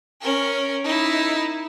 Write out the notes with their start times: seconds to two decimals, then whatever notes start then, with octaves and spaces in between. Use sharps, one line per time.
0.22 C#4 A#4
0.84 D#4 E4